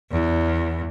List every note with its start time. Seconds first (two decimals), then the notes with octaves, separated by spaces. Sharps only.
0.11 E2